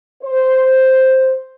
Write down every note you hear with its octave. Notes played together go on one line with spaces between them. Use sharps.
C5